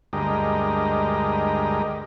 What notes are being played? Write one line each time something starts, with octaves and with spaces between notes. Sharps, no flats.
D2 G2 G#3 G4 A#4 D#5